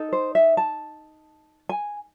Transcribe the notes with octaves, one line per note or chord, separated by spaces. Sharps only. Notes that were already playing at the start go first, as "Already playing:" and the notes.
Already playing: D#4 A4
C5
E5
A5
G#5